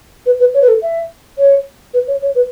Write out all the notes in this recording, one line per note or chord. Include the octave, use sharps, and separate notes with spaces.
B4
B4
C#5
B4
A4
E5
C#5
B4
C#5
C#5
B4